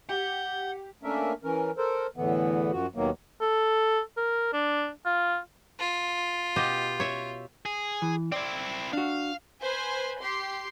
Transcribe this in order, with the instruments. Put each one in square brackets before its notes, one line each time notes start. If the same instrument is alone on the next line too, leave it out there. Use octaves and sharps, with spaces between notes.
[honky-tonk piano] G4 [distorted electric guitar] F#5 [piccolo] G6
[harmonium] A3 A#3 C#4 D4 A#4 E5
E3 C#4 A#4
A4 A#4 C5
E2 A2 D3 E3 B3
F#2 F3 F#4
D#2 B2 D#3 F#3 A#3
[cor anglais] A4
A#4
D4
F4
[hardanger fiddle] F4
[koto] B2 G4 D#5
C#5 E5
[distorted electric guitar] G#4
[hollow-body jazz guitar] E3
[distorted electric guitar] C4 E4 [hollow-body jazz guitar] D5
[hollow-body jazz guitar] D4 F#4 [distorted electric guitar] F5
[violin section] B4 C5 G#5
G4 C6 C7